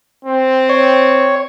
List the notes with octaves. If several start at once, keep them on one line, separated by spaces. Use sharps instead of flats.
C4
C#5